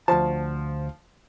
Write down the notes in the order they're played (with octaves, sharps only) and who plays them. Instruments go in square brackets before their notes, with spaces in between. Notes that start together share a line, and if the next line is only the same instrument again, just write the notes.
[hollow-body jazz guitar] D2 A5 [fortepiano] F3